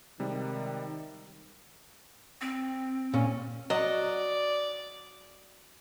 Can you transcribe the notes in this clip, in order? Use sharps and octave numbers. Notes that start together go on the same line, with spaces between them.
C3 D#3 G3 G#3
C4
A#2 C#4
F#3 D5 D#5 F#5